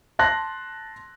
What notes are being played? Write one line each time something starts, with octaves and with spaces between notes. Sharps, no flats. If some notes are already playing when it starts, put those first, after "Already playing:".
A5 C6 F#6 A#6